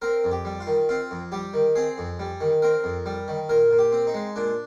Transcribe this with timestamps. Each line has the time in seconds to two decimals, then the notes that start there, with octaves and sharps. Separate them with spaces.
0.02 C4 A#4
0.24 F2
0.31 G4
0.45 G3
0.60 F4
0.67 D#3
0.89 C4 F4
1.11 F2
1.32 G3 G4
1.54 D#3
1.75 C4 G#4
1.98 F2
2.19 G3
2.41 D#3
2.62 C4 A#4
2.84 F2
3.06 G3
3.28 D#3
3.49 A#2 A#4
3.71 A#2
3.78 G4
3.92 C4
4.07 D#4
4.14 G#3
4.36 A#2 D4